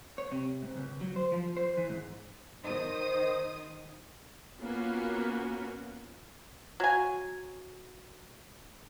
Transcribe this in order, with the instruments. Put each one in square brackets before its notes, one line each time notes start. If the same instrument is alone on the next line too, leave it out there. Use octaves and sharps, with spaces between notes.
[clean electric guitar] C#5
C3
G#2
C#2
F#3
C5
F3
C5
E3
G#2
[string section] D#3 C5 D#6
[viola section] A#3 B3 C#4 F4 F#4
[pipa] F#3 G#5